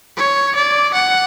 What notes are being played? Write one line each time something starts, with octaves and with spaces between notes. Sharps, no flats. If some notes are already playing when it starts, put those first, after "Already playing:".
C#5
D5
F#5